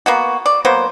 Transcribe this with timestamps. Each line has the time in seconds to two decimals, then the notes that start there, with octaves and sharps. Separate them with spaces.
0.06 A#3 B3 F#4
0.46 D5
0.65 F#3 A#3 B3 C5